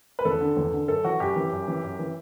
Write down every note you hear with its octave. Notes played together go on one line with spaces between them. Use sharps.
B4
E2 A4
D3
E2
D3
F#2 A4
E3 F#4
F#2 G4
E3
F#2
E3
F#2
E3